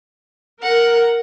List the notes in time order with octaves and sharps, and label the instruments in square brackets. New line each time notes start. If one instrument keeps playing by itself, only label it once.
[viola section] A#4 [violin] F#5